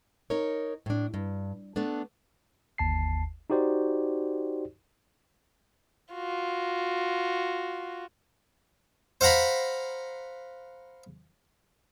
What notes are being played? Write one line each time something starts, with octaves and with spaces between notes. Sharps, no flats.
D#4 A#4 C#5
A2 D4
G2
A3 B3 D4
G1 D#2 A5 C7
D#4 F#4 G4 C5 D5
F4 F#4
C5 F5 F#5 A#5 B5